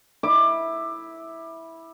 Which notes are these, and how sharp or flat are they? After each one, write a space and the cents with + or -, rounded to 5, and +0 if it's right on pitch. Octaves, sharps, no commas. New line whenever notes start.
E4 -10 D6 +20